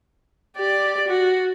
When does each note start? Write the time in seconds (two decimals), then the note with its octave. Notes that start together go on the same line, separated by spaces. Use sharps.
0.57 G4 D5
1.07 F#4